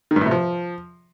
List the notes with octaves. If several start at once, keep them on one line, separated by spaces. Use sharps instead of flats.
D#3
G2
A2
C3
F3